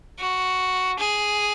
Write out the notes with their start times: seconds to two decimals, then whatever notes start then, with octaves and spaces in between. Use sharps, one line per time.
0.19 F#4
0.99 G#4